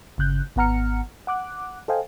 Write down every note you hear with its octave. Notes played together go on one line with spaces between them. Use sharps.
G1 C#3 F#6 G6
G#1 B3 F#5 A#5 F6 C#7
F#5 D6 F#6
A4 C5 D#5 F5 G5 G#5